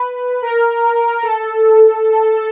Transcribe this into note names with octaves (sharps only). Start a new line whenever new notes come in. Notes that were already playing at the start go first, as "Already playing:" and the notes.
Already playing: B4
A#4
A4